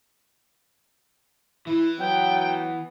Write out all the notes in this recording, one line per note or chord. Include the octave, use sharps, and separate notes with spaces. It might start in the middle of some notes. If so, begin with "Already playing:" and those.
E3 E4
F#3 B3 G5